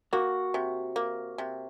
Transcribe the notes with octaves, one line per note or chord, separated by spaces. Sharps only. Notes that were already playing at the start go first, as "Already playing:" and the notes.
A#3 F#4
C3
A#3
C3